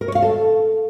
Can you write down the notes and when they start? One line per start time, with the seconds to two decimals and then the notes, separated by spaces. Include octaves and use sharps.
0.01 A#4
0.08 C#5
0.15 F5
0.22 A4